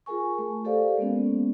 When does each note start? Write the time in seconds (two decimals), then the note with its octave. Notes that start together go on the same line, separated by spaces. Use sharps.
0.06 F4 G#4 A#4 G#5 C#6
0.38 A3
0.65 G4 A4 A#4 C5 D5 F5
0.98 G#3 A#3 B3 C#4